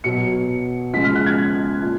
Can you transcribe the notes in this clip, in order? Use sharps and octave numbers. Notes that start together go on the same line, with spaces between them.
B2 F#3 C#7
C#3 F3 G#3 B6
F6
F#6
G#6
A#2